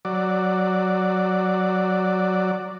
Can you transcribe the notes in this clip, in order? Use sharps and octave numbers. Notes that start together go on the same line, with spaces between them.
F#3 D5